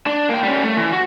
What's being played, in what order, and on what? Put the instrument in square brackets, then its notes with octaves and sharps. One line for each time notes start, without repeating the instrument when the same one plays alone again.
[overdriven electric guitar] D4
A#3 G5
G3 C#4
A3
E3
F#4